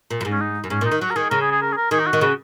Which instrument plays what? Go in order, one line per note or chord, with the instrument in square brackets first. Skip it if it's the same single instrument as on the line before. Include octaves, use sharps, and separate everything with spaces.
[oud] A#2
F#2
G#2
[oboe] C#4
D#4
[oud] F#2
[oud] G#2 [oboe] C#4
[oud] A#2
[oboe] D#4
[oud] D#3
[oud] F#3 [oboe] F#4
[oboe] A#4
[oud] D#3 [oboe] G#4
[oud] C#3 [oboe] A#4
[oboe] G#4
G#4
A#4
G#4
A#4
[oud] D#3 [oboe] G#4
[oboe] D#4
F#4
[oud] D#3
[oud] C#3 [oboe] F#4